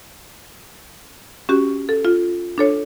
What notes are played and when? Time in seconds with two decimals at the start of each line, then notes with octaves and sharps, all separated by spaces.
1.49 C#4 F#4 G4
1.89 A4
2.05 F4
2.58 D4 A4 C#5